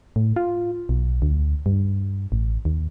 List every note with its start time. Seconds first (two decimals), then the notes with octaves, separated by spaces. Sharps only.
0.16 A2
0.36 F4
0.89 B1
1.22 D2
1.66 G2
2.32 A1
2.65 D#2